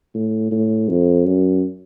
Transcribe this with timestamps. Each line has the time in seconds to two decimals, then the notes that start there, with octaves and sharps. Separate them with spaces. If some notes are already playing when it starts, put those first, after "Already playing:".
0.15 A2
0.52 A2
0.89 F2
1.26 F#2